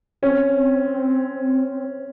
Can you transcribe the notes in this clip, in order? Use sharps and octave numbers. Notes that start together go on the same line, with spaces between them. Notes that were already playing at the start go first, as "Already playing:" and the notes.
C4 C#4